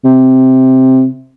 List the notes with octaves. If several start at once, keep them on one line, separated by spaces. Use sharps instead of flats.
C3